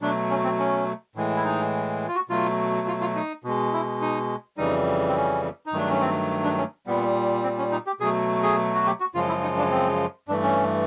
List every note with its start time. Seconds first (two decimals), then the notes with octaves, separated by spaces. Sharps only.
0.01 B2 F#3 A3 D4
0.30 C#4
0.44 C4
0.59 C#4
1.15 A2 E3 G#3
1.36 E4
1.44 D#4
2.08 F4
2.15 F#4
2.29 B2 F#3 A3 F4
2.87 F4
3.01 F4
3.16 D#4
3.44 B2 G#3
3.73 E4
4.02 D#4
4.57 F2 C#3 E3 G3 D#4
5.08 C4
5.15 C#4
5.66 D#4
5.73 G2 D#3 F#3 A3 D4
5.90 C#4
6.01 C4
6.44 D4
6.58 C#4
6.87 A#2 G3 B3
7.43 C4
7.58 C#4
7.72 D#4
7.87 G4
8.00 B2 F#3 A3 G#4
8.43 G#4
8.75 F#4
8.86 G4
9.00 F#4
9.14 F#2 C#3 F3 G#3 F4
9.28 E4
9.43 D#4
9.58 D4
9.71 C4
10.28 G2 E3 A3 D4
10.43 C#4